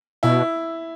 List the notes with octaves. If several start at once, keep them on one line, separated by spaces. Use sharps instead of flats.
B2 E4